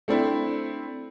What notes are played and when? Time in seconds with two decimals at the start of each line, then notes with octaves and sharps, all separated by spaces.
0.08 A3 C4 D4 E4